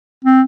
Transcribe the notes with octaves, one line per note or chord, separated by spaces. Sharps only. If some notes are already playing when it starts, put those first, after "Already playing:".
C4